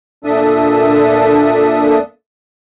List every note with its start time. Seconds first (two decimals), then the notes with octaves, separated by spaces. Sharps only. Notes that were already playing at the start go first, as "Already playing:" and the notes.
0.25 A#2 D4 A4 E5 D#6